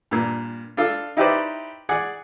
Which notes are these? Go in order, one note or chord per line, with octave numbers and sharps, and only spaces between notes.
G2 A#2
D4 F4 A4 F5
D#4 E4 G4 B4 C5 D5
G#4 D5 F#5